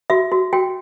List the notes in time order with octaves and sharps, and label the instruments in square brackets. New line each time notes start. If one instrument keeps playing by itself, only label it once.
[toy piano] F#4 E5
F#4
F#4 G5